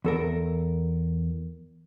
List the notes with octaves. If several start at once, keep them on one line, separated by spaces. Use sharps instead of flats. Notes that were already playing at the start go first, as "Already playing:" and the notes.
E2 A4 A#4